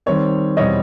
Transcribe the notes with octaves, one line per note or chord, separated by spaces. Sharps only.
D#3 G3 C4 C#5
E2 B2 G3 C4 C#5 D#5